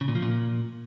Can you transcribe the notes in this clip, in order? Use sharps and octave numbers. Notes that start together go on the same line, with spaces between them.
C#3
A#2
F3
A#2